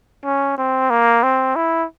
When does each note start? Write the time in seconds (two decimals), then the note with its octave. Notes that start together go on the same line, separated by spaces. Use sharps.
0.25 C#4
0.58 C4
0.90 A#3
1.23 C4
1.56 E4